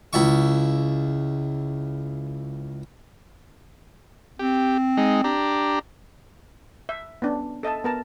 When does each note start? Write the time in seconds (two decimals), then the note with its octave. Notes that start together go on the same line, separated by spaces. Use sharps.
0.13 C#2 E4 C#6
4.39 C4 G4
4.97 G#3 D#4
5.24 D4 G4 A#5
6.89 E5
7.22 B3 C#4 D4
7.63 A4 D#5 E5 A5
7.84 B3 A#4 A5 A#5